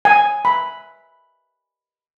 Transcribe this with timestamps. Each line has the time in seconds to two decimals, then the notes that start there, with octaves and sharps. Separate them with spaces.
0.05 G#5
0.45 B5